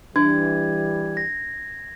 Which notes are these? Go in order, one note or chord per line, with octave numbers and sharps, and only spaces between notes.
E3 G3 D4 G#6
A#6